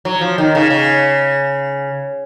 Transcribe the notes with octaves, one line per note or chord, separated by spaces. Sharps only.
F#3
F3
D#3
C#3
C#3